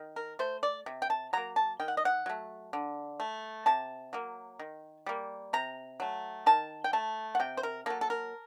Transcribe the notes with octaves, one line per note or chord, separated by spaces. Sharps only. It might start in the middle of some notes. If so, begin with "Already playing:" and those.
Already playing: D#3
A#4
A3 C5
D5
C3
G5
A5
F#3 A#3 A#5
A5
D#3 G5
F#5
D#5
F#5
F#3 A3
D3
A3
C3 A5
F#3 A#3
D#3
G3 A#3
C3 A#5
F#3 A3
D#3 A5
G5
A3 A5
F#5
C3 G5
C5
A#4
F#3 A#3 A4
A4
A#4